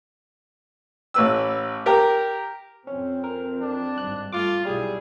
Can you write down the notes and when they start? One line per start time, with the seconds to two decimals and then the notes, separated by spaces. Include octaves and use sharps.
1.14 A1 B4 E6
1.86 G4 A#4
2.87 F2 C4 C#4
3.24 A#4
3.61 D4
3.98 G#1 G2 F#6
4.33 G3 A3 F4 D6
4.65 B1 G3 E4 G#4